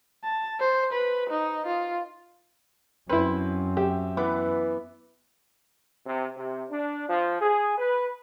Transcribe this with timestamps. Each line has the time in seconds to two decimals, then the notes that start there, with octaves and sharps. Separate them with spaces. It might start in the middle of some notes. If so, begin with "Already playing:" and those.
0.24 A5
0.60 C5
0.93 B4
1.30 D#4
1.67 F4
3.09 F#2 C4 E4 B4
3.77 G4 E5
4.17 E3 B3 F#5 D6
6.05 C3
6.36 C3
6.70 D4
7.08 F3
7.40 G#4
7.77 B4